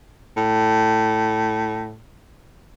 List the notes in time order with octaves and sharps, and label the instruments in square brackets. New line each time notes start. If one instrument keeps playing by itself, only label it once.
[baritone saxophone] A2